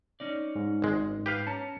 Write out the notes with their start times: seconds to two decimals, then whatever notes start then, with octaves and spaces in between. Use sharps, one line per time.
0.20 C#4 D#4 D5
0.55 G#2
0.82 G#1 G#3
1.26 G4 B4 F5
1.47 C#4 A5 A#5